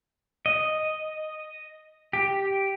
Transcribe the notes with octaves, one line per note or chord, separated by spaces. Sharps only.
D#5
G4